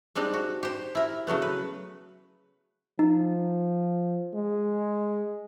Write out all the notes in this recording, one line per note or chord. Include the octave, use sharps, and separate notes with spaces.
G3 G#3 C4 D4 D#4
F#4
G4 C5
E4 A#4
C#3 F#3 A3 B3
B4
F3 D#4
G#3